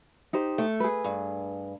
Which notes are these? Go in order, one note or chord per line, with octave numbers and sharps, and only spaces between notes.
D#4 G4 C5
A3
G#4 B4
G2